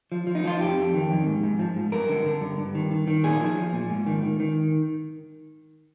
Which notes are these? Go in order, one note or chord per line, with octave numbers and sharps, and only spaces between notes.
F3
F3
D#4
F3 F4
F2 G4
F2
D#3
F2
G#2
G#2
F3
G#2
G2 A#4
D3
D3
G2
G2
D#3
D#3
D#3
A#2 G#4
F3
F3
A#2
G#2
D#3
D#3
D#3